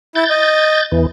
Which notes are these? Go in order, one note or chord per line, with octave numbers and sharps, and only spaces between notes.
E4 G6 A6
D#5
E2 E3